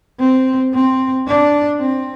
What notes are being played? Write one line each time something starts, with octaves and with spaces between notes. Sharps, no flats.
C4
C4
D4
C4